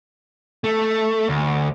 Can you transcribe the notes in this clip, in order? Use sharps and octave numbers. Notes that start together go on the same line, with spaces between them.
A3
D2